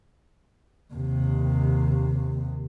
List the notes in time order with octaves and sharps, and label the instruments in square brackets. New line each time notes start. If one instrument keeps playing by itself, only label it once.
[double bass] D#2 C3